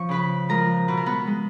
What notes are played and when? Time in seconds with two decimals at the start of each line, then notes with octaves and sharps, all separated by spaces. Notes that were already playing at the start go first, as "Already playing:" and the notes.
Already playing: F3 C#4 C#6
0.09 C#3 B4 B5
0.49 F3 G#3 A#4 A#5
0.88 B2 B4
0.97 A#4
1.06 B3 B4
1.27 G#3